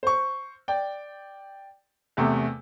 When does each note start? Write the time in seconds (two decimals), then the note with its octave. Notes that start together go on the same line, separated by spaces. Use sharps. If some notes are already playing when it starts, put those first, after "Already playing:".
0.03 C5 C#6
0.68 D5 G5
2.17 E2 C3 A3